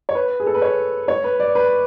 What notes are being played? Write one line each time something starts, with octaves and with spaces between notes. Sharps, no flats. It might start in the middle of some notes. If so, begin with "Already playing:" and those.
C#5
B4
G#4
A4
B4
C#5
C#5
B4
D5
B4